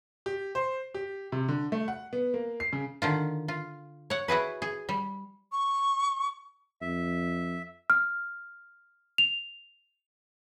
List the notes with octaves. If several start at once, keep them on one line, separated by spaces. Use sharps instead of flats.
G4
C5
G4
C3
D3
A3
F#5
B3
A#3
C7
C#3
D3 D#3 F4
F4
C#5 F#5
E4 F#4 G#4 B4
G#4
G3
C#6
F2 E5
F6
F7